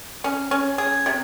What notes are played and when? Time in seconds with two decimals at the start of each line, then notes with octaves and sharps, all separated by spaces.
0.24 C#4
0.51 C#4
0.78 G#4
1.06 C3